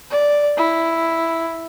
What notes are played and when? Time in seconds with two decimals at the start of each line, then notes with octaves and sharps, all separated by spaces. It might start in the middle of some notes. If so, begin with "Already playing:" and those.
0.11 D5
0.57 E4